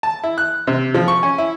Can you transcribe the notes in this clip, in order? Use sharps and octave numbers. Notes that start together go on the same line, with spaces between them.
A5
E4
F#6
C3
F3
C#6
C#4
E4